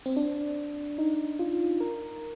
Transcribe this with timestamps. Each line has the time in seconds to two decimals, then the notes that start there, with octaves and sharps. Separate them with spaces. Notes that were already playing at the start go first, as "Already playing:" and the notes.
0.06 C4
0.16 D4
0.98 D#4
1.39 F4
1.80 A#4